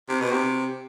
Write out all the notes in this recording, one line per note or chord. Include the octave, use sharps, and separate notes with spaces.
C3
B2
C3